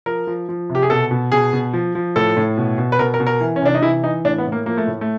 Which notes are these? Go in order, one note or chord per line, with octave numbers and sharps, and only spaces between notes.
F3 A#4
F3
F3
C3
G4
G#4
B2 A4
B2
B2 G#4
B2
F3
F3
A2 A4
A2
B2
B2
B4
B2 A#4
A#4
B2
A#4
E3
C#4
C3 D4
D#4
E3 E4
E3 D#4
A2 D4
B3
A2
A#3
F3 A#3
A3
A2
A3